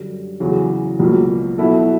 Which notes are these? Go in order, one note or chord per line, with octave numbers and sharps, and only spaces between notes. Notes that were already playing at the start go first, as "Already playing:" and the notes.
Already playing: F#2 D3 G3
E2 C#3 F#3
C#2 B2 F#3 A#3
B2 F#3 B3 E4 A4